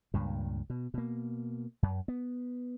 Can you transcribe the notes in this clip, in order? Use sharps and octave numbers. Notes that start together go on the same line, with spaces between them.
C#2 G2 A#2
B2
B2 A#3
F#2
B3